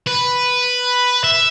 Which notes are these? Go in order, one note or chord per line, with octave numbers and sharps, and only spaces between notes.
B4
E5